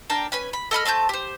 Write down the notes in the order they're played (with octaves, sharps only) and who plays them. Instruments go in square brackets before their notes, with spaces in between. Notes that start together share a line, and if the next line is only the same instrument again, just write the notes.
[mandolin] D4 A#4 G5 A5
C#4 B4 G#5
B5
A4 D#5 B5 F6
A3 C4 A5 G6
G4 C5